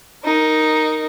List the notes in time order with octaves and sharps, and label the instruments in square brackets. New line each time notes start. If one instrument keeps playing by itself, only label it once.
[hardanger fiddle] D#4 A#4